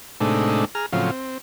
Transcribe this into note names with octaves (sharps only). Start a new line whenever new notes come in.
A2 C3 G#3 A3 D4 D#4
G#4 A#5 F6
A2 C#3 F3 F#3 C4 F4
C4